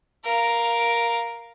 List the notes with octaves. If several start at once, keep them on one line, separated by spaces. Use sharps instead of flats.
A#4 F5